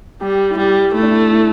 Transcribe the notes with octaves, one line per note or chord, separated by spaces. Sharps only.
G3 G4
E4
G3 G4
A3 E4
D4
E4
E4